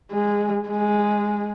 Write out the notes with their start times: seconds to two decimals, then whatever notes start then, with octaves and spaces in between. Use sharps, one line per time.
0.12 G#3
0.68 G#3